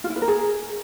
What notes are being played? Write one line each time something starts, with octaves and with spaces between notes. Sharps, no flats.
F4
E4
B4
A#4
G#4